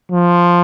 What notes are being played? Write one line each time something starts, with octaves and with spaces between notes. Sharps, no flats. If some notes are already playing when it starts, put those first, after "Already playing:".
F3